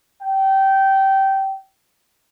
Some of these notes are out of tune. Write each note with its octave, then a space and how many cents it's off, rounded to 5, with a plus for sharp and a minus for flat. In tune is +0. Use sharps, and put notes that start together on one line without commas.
G5 -20